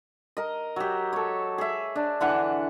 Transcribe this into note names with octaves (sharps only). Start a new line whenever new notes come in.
A#4 D#5
F#3 G4
A4 C#5
G#4 E5
D4
D3 E3 F#5